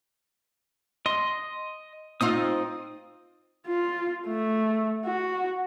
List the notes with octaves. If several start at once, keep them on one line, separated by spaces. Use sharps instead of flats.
D#5 C6
C4 D#4 F4 D#6
F4
A3
F#4